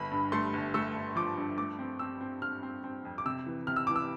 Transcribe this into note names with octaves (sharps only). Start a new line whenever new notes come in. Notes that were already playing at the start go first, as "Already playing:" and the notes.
Already playing: G1 B5
G2
A3 C6
G1
A3 E6
G1
F3 D6
G2
A3 D6
C4
C4 E6
C4
C4 F6
C4
C4
F2
D6
C3 E6
E3
C3 F6
E6
E3 D6
E6